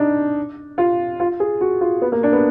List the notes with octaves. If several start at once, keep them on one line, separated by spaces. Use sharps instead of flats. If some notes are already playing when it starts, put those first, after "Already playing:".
Already playing: D4 D#4
F4
F4
G#4
F#4
F4
B3
A#3
D4
B3